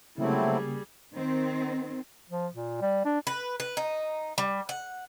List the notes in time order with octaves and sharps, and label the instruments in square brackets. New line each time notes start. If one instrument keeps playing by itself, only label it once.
[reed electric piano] C#3 A#3 [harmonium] F#3 C4 E4 [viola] G3 G#4 [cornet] A3
[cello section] D#3 C4
[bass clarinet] F3
A#2
G3
D4
[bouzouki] B4
B4
D#4
G3
F#5